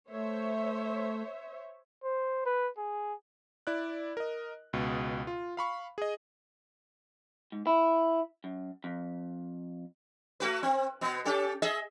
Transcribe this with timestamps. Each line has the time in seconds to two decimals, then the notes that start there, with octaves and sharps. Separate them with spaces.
0.10 A3 C5 C#5 E5
2.04 C5
2.46 B4
2.78 G#4
3.67 E4 D5 F#6
4.17 A#4 D#5
4.73 C#2 B2
5.27 F4
5.57 F5 B5 C#6
5.98 G#4 D#5
7.52 G#2
7.67 E4
8.44 F#2
8.84 F2
10.40 A3 F#4 B4
10.63 C4
11.01 B2 B3
11.25 C#4 G4 A4
11.62 G#4 D#5 E5